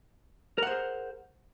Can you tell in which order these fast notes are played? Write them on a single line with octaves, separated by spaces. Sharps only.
A#4 F#5 C5 G#4